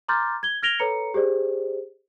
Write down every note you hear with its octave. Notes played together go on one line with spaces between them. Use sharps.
A#5 C6 D6 F6 G6 A6
G#6 G7
F6 G#6 A#6 D7 F7 G7
A4 B4 C#5 A#5 C#7
G4 G#4 C5 D5